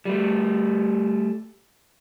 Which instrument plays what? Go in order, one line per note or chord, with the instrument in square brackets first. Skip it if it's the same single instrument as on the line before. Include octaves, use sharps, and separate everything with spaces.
[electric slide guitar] G3 A3